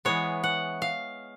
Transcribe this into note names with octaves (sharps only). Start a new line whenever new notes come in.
E3 G#3 B3 C#5
F#5
F5